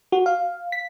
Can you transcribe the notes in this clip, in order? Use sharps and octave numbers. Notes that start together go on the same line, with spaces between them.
F#4
F5
B6